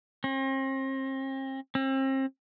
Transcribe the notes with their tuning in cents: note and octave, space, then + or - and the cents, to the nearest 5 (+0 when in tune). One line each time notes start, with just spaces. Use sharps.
C4 +40
C4 +35